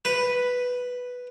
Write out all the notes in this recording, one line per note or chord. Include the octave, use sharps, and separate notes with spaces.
B4